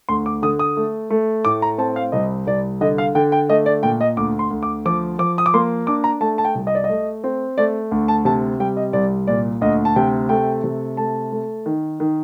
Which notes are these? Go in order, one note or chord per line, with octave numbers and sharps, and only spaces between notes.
D2 C6
D6
D3 D#6
D#6
A3
A3
A2 D6
A#5
C4 A5
F5
C2 D#5
C2 D5
D3 D#5
F5
D3 G5
G5
A3 D#5
D5
A#2 G5
D#5
D2 D6
C6
D2
D6
F3 D6
F3 D6
D#6
D6
A#3 C6
D4 D6
A#5
A3 A5
A5
G5
C2
D#5
D5
D#5
A3
C4
A3 D5
D2
A5
C3 A5
G3 G5
D#5
C2 D5
A#2 D5
D2 D#5
A5
C3 G5
A3 G5
C3
A3 A5
A3
D#3
D#3